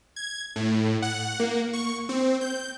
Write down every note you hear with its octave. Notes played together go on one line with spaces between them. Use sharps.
G#6
A2
F#5
A#3
C#6
C4
G6